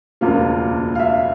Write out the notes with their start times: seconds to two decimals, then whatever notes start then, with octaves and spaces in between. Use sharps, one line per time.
0.21 E1 D2 C#3 F3 A#3 F5
0.95 F5
0.99 E5